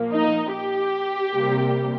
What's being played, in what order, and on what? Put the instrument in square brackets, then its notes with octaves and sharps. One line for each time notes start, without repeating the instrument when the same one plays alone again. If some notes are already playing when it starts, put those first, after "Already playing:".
Already playing: [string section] A#2 F3 A#3
D#4
G4
C3 G3 A#3